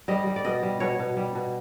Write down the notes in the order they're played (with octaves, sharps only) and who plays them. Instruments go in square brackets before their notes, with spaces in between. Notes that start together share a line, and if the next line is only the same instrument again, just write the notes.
[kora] G3 D#5
G3
D5
B2 D#5
G3
B2 C#5
B2
G3
B2